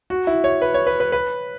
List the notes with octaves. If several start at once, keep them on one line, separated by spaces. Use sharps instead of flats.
F#4
E4
C#5
B4
C#5
B4
B4
B4